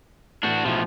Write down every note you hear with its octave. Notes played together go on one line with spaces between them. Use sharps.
A2 E3 D4 F#4 G6
B1 A2 F3